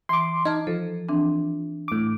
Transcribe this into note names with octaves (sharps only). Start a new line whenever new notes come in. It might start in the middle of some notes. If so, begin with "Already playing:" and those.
E3 C6 D6
D#4 A5 F6 G#6
F3 A4
E3 C4 D4
A2 D6